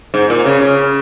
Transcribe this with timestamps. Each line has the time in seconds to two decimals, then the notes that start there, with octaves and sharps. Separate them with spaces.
0.14 G#2
0.30 A#2
0.45 C#3
0.61 C#3